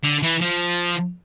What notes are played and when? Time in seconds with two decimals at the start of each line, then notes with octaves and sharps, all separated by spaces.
0.03 D3
0.22 E3
0.41 F3